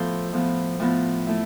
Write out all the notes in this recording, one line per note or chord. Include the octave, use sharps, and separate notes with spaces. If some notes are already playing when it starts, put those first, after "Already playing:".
Already playing: A2 F3 B3 A4 C5
A2 F3 B3
A2 F3 B3
A3 E4